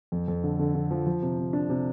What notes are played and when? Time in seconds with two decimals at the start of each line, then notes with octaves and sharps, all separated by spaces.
0.12 F2
0.28 F2
0.44 D3
0.59 D3
0.75 D3
0.91 F3
1.07 F3
1.22 C3
1.38 C3
1.53 D4
1.70 C3